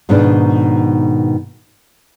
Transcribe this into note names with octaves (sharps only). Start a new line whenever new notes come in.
G#2 B2 D#3 B3 D4